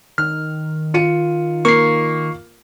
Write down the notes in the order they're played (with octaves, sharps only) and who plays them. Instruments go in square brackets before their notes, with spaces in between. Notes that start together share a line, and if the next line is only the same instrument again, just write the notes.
[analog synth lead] D#3 [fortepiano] F6
[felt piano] F4 C#7 D#7
[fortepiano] A#3 [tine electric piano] C#6 C7